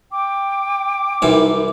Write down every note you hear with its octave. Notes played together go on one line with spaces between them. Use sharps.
G5 D6
C2 F#2 E3 D#4